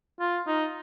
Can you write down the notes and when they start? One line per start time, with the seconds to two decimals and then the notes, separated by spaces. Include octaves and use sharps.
0.20 F4
0.47 D#4